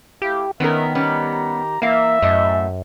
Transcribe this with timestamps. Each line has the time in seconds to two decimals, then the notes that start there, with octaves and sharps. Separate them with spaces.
0.22 A3 E4 G4 F5
0.60 D#3 B3 C#4 A#4 D#5 E5
0.95 G3 B3 C#4 G4 A#5
1.82 E3 A#3 E5 F5
2.22 F#2 A2 A3 D#5